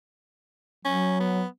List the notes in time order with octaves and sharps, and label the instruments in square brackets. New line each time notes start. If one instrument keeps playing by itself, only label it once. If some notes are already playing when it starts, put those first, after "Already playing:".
[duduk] F#3 [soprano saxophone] C#4
[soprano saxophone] B3